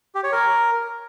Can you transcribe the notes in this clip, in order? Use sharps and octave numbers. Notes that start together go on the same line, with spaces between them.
G4
C#5
A#4